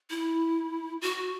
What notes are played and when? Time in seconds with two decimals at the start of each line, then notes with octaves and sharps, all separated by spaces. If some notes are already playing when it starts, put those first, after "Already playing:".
0.10 E4
1.02 F#4